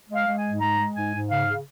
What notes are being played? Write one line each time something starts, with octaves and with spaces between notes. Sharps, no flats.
G#3
F5
G#3
G#5
G#2
G#3 A#5
G#3
G#2 G#5
G#2
C#3 F5
C#3